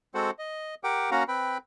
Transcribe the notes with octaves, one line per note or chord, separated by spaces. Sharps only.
G#3 C4 F#4 A4 C5 F#5
D#5
G4 A#4 F#5 G5 D6
A#3 C#4 F#4 F5 F#5 A#5
C4 B4 G5 B5